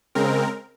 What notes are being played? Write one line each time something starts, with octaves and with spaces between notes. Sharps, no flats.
C#3 G#3 C4 A#4